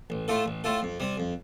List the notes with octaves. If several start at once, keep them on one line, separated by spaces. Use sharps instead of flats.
A1
A2 A3 F4 A4
A1
A2 A3 F4 A4
F2
C3 G3
F2